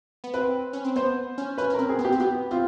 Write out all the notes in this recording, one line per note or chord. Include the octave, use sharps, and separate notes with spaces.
B3
C4 B4
C#4
C4
B3 C5
C#4
C#4 B4
C#4
A#4
C4
G#4
B3
G4
C4
B3 G4
C4 F4